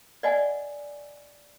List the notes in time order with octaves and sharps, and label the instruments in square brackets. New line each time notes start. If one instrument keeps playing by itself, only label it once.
[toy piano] D5 D#5 F#5 G#5